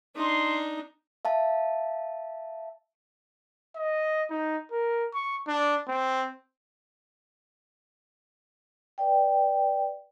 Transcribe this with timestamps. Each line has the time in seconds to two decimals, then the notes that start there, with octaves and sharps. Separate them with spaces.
0.16 D4 D#4 C6
1.25 E5 F5 A5
3.76 D#5
4.30 D#4
4.72 A#4
5.14 C#6
5.48 D4
5.88 C4
8.98 B4 D5 G5